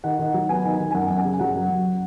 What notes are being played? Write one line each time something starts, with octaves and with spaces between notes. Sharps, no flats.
D#3 F#5
D#3
F#3
B3 G#5
D#3
D#3
G#5
F#2 F#5
F#2
G#5
C#3
F#3 F#5
F#2
F#2